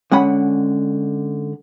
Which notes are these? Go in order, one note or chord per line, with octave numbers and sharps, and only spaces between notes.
D3 G#3 C#4 F#5 B5